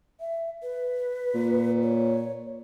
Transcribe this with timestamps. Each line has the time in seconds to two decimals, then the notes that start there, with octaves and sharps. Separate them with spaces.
0.20 E5
0.63 B4
1.34 A#2
1.83 C#5